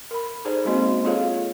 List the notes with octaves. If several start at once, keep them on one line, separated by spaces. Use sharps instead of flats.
A#4 B5
D#4 G#4 A4 C5 D5
G#3 A#3 C4 C#4 F#4 D#5
F4 G#4 A4 C#5 F5